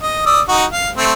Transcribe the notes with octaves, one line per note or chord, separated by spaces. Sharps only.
D#5
D5 D#6 E6
D#4 F#4
F5
A3 C4